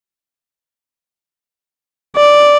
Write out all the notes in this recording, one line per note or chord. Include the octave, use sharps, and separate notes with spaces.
D5